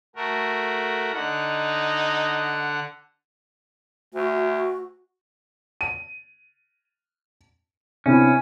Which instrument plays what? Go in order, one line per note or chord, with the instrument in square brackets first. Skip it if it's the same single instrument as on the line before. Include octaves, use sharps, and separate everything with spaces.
[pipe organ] A3 F#4 A#4
[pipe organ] D3 F#5 [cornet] D#4
[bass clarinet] D2 [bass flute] F#4
[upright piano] D#7
[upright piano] C3 [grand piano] B3 D4 E4 [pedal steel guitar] C#4